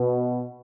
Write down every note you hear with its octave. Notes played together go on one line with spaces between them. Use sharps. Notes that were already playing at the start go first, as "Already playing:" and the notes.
Already playing: B2